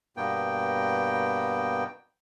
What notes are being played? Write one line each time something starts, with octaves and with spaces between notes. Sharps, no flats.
G2 B2 A#3 B3 G5